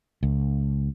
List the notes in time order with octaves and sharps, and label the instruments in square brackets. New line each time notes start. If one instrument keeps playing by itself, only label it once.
[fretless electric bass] C#2